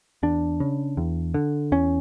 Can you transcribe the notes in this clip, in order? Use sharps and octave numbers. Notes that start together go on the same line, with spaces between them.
E2 D4
C#3
E2
D3
E2 C#4